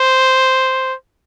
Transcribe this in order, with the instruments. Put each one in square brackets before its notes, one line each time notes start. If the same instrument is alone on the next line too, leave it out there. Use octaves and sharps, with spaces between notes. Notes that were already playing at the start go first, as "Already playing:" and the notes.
Already playing: [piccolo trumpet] C5